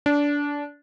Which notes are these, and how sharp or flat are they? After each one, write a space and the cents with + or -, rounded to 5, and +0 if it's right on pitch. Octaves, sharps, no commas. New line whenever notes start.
D4 -20